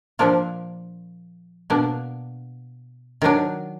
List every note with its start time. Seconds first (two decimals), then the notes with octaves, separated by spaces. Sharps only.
0.19 A#2 F3 A#3 D4 F4
1.70 B2 A#3 D4
3.22 D#3 F#3 D4